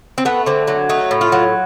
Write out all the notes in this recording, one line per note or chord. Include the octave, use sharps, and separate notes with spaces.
C4
A3 B3
D3 C4
F#3
A3 D#4
A2
F4
F#3